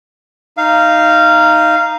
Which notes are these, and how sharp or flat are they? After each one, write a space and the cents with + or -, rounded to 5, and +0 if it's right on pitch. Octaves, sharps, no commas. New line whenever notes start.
D#4 +0 F5 -15